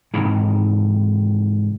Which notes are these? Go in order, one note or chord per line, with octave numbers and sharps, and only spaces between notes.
G#2 C3 D#3 E3